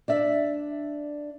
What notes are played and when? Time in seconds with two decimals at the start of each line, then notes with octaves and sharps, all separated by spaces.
0.08 D4 D5 E5